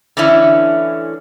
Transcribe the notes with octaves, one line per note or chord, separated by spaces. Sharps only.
D3 E3 A3 C#4 E4